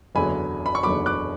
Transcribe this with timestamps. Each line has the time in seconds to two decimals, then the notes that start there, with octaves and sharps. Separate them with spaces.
0.15 F#1 E2 D3 F#3 G#5 B5
0.66 B5
0.75 C#6
0.83 F#1 E2 D3 F#3 B5 D6
1.06 D6 F#6